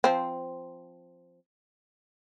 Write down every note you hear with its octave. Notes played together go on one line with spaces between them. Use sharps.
F3 C4